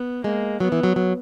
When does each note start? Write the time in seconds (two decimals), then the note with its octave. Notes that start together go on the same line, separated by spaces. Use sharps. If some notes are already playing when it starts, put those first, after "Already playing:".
Already playing: B3
0.24 G#3 A#3
0.60 F#3 B3
0.72 E3
0.83 F#3
0.96 F#3